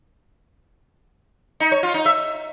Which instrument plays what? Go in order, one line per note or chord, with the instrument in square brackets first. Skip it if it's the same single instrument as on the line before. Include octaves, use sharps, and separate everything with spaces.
[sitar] D#4
C#5
F4
D#4
E5